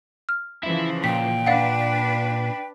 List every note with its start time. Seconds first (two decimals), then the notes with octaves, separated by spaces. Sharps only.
0.29 F6
0.63 C#3 E3 F3 E4 E5
1.04 A#2 G5 B6
1.46 D4 B4 D5 F5 F#5